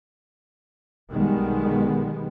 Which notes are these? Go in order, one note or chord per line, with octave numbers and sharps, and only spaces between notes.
B1 D#3 G3 G#3 B3